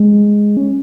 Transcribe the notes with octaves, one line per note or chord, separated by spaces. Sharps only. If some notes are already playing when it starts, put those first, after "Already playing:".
Already playing: G#3
C#4